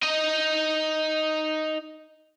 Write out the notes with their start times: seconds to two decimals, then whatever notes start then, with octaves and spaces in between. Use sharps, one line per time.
0.03 D#4 D#5